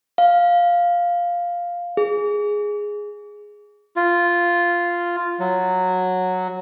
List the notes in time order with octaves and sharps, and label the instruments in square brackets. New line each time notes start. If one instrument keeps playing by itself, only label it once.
[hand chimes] F5
G#4
[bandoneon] F4
F#3